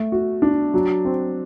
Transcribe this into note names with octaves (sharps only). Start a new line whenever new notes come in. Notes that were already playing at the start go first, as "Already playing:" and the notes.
Already playing: A3
F#4
D4
F#3
C4